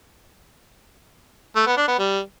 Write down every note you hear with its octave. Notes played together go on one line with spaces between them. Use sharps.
A3
B3
D4
B3
G3